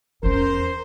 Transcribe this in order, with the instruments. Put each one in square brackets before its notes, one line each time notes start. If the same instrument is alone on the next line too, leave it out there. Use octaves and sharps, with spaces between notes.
[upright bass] E2 C#4 [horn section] A#4 C5